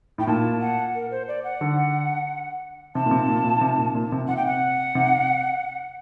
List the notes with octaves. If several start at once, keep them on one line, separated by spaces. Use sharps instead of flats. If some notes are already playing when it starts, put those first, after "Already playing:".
A2 G5
A#2 A5
F#5
A#4
C5
D5
F#5
D3
C3 A5
A#2
C3
A#2
A#2
C3
A#2
A#2
C3
C3 F#5
G5
F#5
C3